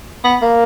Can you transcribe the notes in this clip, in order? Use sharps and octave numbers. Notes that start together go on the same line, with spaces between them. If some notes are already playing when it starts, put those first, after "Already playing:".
B3
A#3